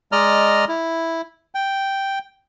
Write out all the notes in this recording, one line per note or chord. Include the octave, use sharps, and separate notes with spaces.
G#3 D5 D#5 A#5 F6
E4
G5